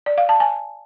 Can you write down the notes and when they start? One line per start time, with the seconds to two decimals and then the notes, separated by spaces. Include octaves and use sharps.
0.06 D5
0.18 F5
0.29 A5
0.40 G#5